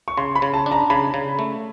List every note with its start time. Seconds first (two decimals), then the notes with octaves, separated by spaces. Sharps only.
0.08 C#6
0.17 C#3 C6
0.35 B5
0.42 C#3
0.54 A5
0.66 D4
0.72 A#5
0.90 C#3 B5
1.14 C#3
1.39 A3